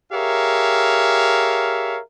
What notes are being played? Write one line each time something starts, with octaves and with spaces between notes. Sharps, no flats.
G4 G#4 A#4 C#5 E5 F5